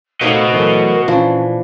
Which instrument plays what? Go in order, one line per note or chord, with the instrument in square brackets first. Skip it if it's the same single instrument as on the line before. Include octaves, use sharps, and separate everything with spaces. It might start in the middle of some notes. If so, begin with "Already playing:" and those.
[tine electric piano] A3 A#3 [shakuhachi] D#4 [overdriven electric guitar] F#4 D#5 [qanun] C5 C#5 E5
[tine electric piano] E3 F#3 A3 [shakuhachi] A#4
[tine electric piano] A#2 [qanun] E3 F3 D4 [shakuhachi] C#4